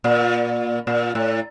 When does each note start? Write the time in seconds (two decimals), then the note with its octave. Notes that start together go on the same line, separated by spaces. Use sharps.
0.04 A#2
0.87 A#2
1.15 A2